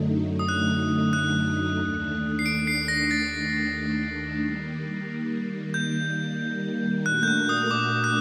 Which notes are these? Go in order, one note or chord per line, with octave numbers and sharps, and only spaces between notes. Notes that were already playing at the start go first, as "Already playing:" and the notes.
Already playing: F#2 D3 F#3 A3 D#4
D#6
F#6
F#6
D#2 D#3 A3 D4
C7
D7
C7
A#6
A6
D#3 G3 A#3
G6
A#2 A3 D4 F#4 A#4 F#6
G6
F#6
D#6
D6
F#6